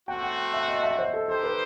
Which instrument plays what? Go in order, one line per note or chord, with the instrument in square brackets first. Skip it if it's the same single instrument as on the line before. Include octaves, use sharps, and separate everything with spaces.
[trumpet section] A3 C4 F#4 [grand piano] G5
[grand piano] F#5
E5
D#5
E5
D#5
C5
A4
[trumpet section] D#4 G4 C5 [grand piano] A4
[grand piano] B4